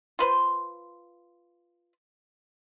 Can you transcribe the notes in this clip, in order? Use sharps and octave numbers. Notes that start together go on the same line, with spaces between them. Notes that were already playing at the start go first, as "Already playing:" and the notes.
F4 B4 C5